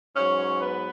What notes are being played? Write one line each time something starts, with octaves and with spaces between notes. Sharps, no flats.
G#2 F#3 C#4 C#5
B3 B4